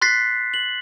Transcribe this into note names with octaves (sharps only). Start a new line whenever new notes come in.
C6 F#6 A6 B6 C7
F#7